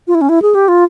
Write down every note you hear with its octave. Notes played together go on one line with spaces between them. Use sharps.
F4
E4
C#4
E4
G#4
G4
F4